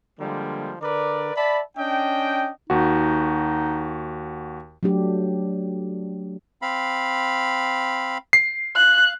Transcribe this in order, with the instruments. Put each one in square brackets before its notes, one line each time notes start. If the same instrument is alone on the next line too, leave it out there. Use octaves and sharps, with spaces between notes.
[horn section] D3 F3 G3 G#3 A#3
D3 A#4 B4 D5
D5 E5 A5 B5
C#4 D4 D#5 G5
[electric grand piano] D#2 F#4 [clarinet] D#4
[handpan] F#3 A3 D4 G4
[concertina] C4 F5 B5
[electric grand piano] C7
[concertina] F5 [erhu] F#6